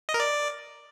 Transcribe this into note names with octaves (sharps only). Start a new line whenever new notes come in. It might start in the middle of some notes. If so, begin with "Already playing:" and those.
D#5
A#4
D5